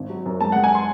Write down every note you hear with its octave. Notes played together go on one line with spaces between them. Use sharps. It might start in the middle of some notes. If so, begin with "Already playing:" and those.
Already playing: G#1
F#3
F#2
G#3 A5
G#3 F#5
G#5
C6